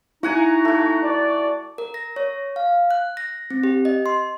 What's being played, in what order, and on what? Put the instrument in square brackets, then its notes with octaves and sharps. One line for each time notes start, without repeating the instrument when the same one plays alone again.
[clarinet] D#4 [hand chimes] E4 [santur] F#4 F#5 G#5
[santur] A3 F#4
[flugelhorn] D5
[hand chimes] A#4
A#6
C#5
F5
F#6
A#6
C4
G4
D#5
C6